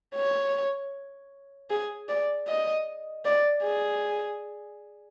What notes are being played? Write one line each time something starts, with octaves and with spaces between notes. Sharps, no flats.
C#5
G#4
D5
D#5
D5
G#4